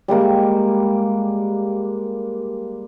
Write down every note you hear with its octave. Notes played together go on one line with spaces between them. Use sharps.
G3 G#3 A#3 C#6